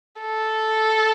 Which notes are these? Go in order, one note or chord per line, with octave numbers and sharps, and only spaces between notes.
A4